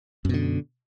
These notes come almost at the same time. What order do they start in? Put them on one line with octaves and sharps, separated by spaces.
F#2 B2 D3